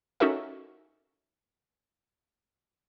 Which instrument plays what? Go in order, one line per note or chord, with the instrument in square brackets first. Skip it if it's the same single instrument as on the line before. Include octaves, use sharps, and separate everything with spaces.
[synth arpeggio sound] C#4 D#4 F#4 A4 A#4 E5